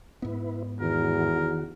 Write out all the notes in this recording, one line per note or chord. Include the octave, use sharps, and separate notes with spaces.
G#2 B3 E4 B4
E2 D#3 F#4 A#4